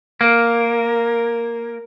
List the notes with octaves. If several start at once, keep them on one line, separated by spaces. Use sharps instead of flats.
A#3 A#4